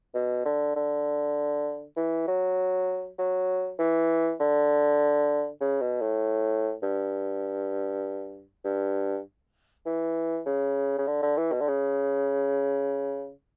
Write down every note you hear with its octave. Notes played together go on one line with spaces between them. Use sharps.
B2
D3
D3
E3
F#3
F#3
E3
D3
C#3
B2
A2
G2
G2
E3
C#3
C#3
D3
D3
E3
B2
D3
C#3